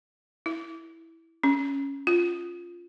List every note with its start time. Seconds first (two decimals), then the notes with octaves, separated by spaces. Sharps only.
0.46 E4
1.44 C#4
2.07 F4